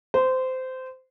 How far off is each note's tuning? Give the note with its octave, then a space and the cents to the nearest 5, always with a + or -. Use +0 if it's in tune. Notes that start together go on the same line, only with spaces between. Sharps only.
C5 -20